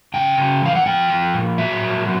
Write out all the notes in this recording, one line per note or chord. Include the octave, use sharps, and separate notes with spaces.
C#3 G5
C#3
E3 F5
F#5
F3 G5
F3
A#2
F#3 E5
A#2
F#3